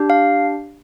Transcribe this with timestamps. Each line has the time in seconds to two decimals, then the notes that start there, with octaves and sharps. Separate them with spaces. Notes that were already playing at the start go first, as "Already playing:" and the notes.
Already playing: D4 G4
0.10 F5